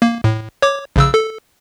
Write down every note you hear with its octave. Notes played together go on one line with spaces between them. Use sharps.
A#3
A2
C#5 D6
A#1 C#3 E6
A4